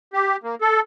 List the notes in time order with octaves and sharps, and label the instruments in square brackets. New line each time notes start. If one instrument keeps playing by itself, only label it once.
[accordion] G4
A#3
A4